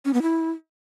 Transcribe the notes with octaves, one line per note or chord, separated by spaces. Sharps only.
C#4
B3
E4